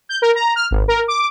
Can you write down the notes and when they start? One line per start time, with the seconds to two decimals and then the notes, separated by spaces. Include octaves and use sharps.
0.09 G6
0.22 A#4
0.35 A#5
0.56 F6
0.71 G#1
0.88 A#4
1.08 D6